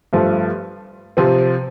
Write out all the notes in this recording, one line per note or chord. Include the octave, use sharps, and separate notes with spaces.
G2 F3 A3
C3 F3 C4